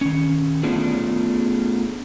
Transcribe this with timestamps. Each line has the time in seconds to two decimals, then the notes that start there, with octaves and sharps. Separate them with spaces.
0.01 D#3 C#4
0.63 A3 B3 C#4 D4 F4 G#4